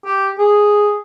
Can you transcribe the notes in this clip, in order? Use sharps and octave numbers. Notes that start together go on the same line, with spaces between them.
G4
G#4